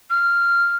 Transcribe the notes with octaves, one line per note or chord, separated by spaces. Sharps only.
F6